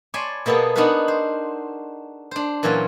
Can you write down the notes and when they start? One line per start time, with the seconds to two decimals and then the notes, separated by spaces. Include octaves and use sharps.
0.14 C#5 D5 G#5 A5 B5 C6
0.46 B2 A#3 B3 G#4 A4
0.76 B3 D4 D#4 F#4 A#4 B4
1.08 C5
2.31 D4 C5
2.63 A#2 E3 F#3 C#4 F4